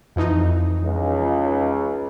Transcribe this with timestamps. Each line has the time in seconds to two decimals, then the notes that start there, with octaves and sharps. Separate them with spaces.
0.16 F2 E3 D#4
0.83 C#2